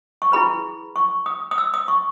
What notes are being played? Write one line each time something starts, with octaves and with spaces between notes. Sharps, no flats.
C#6
E4 G#4 B4 B5
C#6
D#6
D#6
E6
D#6
C#6